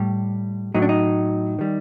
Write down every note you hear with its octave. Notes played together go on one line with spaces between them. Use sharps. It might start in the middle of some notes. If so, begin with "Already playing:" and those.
Already playing: A2 G3
A2 F#3 D#4
D4
D#4
D#3 G3